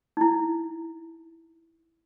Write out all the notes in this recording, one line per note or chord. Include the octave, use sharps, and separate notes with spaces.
D#4 E4